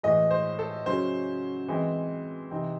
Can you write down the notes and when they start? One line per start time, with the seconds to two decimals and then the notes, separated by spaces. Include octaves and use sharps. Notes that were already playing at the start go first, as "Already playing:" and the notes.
0.03 A2 E3 G#3 D#5
0.31 C5
0.59 A4
0.86 C#3 F#3 C#4 C5
1.68 E3 G#3 C4
2.51 C3 E3 C4 D#4